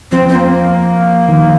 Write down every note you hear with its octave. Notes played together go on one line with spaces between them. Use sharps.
F3 C4
C4
A#3
D#3